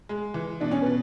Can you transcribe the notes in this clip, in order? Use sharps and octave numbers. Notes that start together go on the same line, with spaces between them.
G#3
E3
B2 D4
C#4
B2 B3